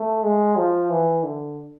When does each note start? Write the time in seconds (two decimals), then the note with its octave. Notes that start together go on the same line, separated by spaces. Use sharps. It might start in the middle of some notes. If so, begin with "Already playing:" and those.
Already playing: A3
0.23 G#3
0.56 F3
0.90 E3
1.23 D3